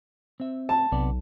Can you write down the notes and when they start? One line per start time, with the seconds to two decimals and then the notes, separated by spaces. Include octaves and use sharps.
0.40 C4 E5
0.69 A5
0.92 B1 C3 B3 D5